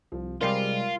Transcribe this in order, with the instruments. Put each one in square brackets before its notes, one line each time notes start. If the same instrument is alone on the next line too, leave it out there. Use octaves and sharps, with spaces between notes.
[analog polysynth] C2 [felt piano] F3
[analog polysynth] C3 G3 G#3 [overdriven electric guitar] F4 [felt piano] A#4 D5 C7